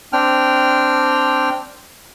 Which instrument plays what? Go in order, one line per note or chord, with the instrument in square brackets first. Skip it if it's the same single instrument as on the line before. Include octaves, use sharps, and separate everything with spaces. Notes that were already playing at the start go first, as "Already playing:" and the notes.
[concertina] C4 D4 G5 F6